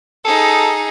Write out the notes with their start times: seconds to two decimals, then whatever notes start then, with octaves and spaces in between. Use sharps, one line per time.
0.25 D#4 G#4 A4